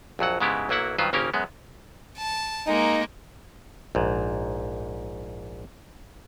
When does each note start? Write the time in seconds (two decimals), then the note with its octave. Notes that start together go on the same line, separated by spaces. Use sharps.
0.19 A#1 F2 F#3 F#5
0.40 G#2 C#3 G#3 B3 E4 G4
0.69 B1 F#3 A#3 E4 F#5
0.98 G2 D#3 F#3 F4 B4 C5
1.13 G#1 C#3 A#3 C#4 G4 A#4
1.34 F#2 G#3 B3
2.18 A5
2.67 G#3 A#3 D#4
3.95 A#1 G#2